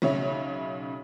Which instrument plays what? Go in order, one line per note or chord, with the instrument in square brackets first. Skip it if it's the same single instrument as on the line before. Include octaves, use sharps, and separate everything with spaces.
[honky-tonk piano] B1 C#3 C#5 E5